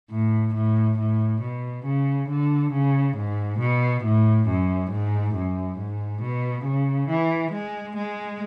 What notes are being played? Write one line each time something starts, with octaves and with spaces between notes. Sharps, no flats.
A2
A2
A2
B2
C#3
D3
C#3
G#2
B2
A2
F#2
G#2
F#2
G#2
B2
C#3
E3
G#3
G#3